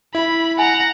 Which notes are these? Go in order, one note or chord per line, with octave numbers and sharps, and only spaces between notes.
E4 B5
F#5 G#5 A#5